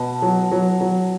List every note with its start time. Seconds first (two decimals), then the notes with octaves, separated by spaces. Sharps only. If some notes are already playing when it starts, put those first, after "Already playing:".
Already playing: B2 B3 A5
0.22 F#3
0.51 F#3
0.81 F#3